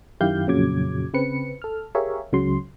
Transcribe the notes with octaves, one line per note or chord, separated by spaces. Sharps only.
F#2 D#3 E4 G4 F5 G6
F2 A#2 C#3 F#3 D6 G#6
C#3 C4 B4 C#7
A4 F6
G4 G#4 A#4 C#5 E5 F5
C#2 C#3 F#3 C6